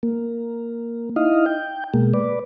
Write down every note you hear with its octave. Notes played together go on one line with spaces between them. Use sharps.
A#3
D#4 E4 D#5 F5
G5
B2 G#3 A#3
B4 D5